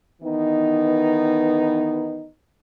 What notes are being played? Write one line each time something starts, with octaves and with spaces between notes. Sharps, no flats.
D#3 E3 B3 D#4